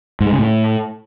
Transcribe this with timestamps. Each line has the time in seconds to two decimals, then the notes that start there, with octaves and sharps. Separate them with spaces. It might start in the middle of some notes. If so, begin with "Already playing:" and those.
0.20 G#2
0.26 G#3
0.32 C#3
0.38 A2